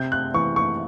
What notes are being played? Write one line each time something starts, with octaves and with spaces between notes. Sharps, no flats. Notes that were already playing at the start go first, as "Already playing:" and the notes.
Already playing: C3 G6
F#6
E3 C#6
C#6